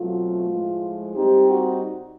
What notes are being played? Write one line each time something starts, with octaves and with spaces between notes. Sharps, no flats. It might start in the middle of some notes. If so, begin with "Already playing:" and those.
Already playing: B2 F#3 A3 C4 F4
A2 F3 G#3
A#2 G3 C4 D#4 G4
F#4